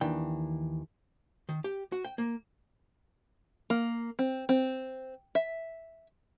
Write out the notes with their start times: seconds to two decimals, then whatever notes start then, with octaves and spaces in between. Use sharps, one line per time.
0.01 D#2 D#3 E3 D4 G5
1.49 D#3
1.64 G4
1.92 F#4
2.05 G5
2.18 A#3
3.70 A#3
4.19 C4
4.49 C4
5.35 E5